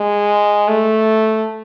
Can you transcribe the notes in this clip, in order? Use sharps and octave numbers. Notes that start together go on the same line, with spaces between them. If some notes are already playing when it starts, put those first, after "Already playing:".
Already playing: G#3
A3